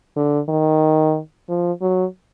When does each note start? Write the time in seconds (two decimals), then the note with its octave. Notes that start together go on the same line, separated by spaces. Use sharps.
0.16 D3
0.49 D#3
1.49 F3
1.81 F#3